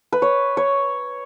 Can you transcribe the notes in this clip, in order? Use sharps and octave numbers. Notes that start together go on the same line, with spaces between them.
B4
C#5
C#5